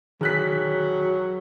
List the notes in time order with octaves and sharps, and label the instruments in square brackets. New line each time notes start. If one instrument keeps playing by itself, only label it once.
[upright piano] E1 F#6 B6 [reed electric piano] D#3 [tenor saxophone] F#3 [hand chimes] G#4